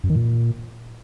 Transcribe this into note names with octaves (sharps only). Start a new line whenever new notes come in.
F#2
D#3
A#2